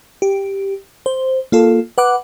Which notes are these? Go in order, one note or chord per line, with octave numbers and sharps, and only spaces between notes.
G4
C5
A#3 F4 A4
B4 F#5 D6 F#6